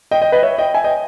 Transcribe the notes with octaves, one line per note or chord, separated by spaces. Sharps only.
D#5 G5
D#5 G5
B4 D#5
C#5 E5
D#5 G5
E5 G#5
D#5 G5